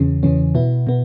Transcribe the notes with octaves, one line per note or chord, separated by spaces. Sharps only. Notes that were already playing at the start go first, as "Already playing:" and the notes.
Already playing: E2 C#3 E3 C#4
E2 C#3 E3 C#4
B2 B3 E4
B2 B3